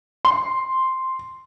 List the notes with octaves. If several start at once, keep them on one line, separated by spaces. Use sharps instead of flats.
C6